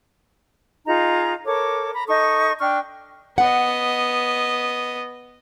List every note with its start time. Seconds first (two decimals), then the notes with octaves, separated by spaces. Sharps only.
0.86 D#4 F4 G#4 A#5
1.45 A4 A#4 C#5 D6
1.94 A#5 B5
2.08 D#4 A4 C#6 D#6
2.60 D4 G5 C#6 F6
3.38 B3 D#5 F#5